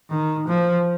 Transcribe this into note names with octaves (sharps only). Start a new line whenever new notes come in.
D#3
F3